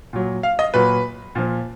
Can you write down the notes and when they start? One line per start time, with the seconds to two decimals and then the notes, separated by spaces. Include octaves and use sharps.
0.13 A#2 F#3
0.43 F5
0.59 D#5
0.74 A#2 F#3 B4
1.35 A#2 F3